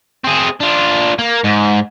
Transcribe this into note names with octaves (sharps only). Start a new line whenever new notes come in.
C4 G#4
D4 F4
A#3
G#2